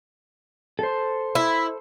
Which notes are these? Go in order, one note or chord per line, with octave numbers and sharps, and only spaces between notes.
A4 C5
E4